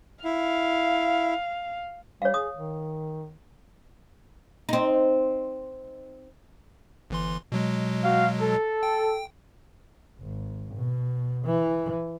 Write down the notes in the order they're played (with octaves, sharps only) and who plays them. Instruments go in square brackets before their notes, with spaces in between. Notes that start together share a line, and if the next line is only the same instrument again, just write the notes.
[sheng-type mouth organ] E4 [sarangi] F5
[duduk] G3 [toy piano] C#5 F5
[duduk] G#4 [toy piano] D#6
[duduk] D#3
[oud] C4 D#4
[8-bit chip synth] G1 E3 C6
B2 F#3 G#3
[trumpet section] F#4 F5
A4
[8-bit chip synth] G5
[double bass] G#1
B2
E3